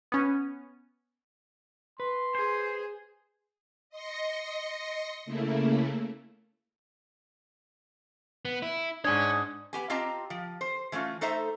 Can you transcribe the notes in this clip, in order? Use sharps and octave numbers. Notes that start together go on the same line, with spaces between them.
B3 C#4
B4 C6
G#4 C5
D#5 C6 A#6 C#7
C#3 A3 A#3 E4
B3
E4
G#2 D4 C#5 G#5 D#6 G#6
B3 G4 G#5
C4 F4 G4 D#5 A5 A#5
F3
C5
E3 A3 C#4 F4
A3 D#4 A4 C5 E5 A#5